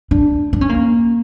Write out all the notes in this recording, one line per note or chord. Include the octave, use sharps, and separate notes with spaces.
D4
D4
C#4
A#3